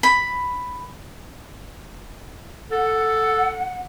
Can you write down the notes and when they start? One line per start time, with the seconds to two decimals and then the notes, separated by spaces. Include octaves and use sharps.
0.03 B5
2.71 A4 F#5